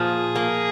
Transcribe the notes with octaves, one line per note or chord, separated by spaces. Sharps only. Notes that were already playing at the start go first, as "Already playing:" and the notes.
Already playing: A#2 F3 G#4
A#3